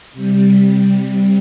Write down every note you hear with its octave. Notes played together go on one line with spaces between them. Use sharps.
C3 G3